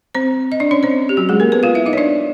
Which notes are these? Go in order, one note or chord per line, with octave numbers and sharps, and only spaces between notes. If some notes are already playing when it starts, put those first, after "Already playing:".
C4 C5
D#5
D4 D5
C#4 C#5
C4 C5
G4
F#3 F#4
G#3 G#4
A#3 A#4
B3 B4
F4 F5
E4 E5
D#4 D#5
C#5
D4 D5